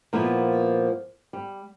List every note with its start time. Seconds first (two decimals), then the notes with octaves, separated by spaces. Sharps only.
0.13 A#2 F3 A#3 B3 E4
1.33 G3